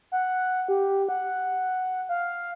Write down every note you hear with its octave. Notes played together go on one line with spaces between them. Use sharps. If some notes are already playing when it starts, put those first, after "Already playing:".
F#5
G4
F#5
F5